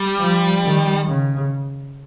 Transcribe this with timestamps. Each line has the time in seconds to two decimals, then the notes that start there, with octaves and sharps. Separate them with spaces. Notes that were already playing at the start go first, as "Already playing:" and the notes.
Already playing: G3
0.19 F3
0.65 D#3
1.09 C#3